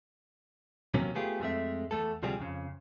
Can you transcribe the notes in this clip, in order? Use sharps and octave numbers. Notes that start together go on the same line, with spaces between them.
D#2 C3 F#3 A#3 C4 C#4
A3 B3 F4 G4 G#4
F2 F3 G#3 A3 C4 E5
E2 A3 A4
D2 C3 F3 G3 C4 G#4
F2 C#3